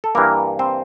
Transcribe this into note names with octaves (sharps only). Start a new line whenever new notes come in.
A4
G2 E3 A#3 A#4
C4 C5